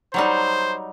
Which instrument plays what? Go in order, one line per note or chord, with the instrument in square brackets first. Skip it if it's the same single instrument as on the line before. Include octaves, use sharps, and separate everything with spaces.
[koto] F#3 G3 D#4 [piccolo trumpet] C5